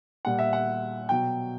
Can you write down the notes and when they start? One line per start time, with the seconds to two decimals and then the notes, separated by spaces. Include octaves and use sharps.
0.25 A#2 G3 F#5
0.39 E5
0.53 F#5
1.09 B2 F#3 G5